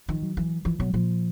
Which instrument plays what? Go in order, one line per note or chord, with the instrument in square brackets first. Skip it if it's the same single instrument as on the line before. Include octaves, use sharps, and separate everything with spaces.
[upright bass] D#3 [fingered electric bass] F3
[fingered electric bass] F#3
[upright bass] E3
[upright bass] E3 [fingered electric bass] F3
[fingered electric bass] B2 [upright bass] F#3
[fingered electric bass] A#2 [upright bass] F3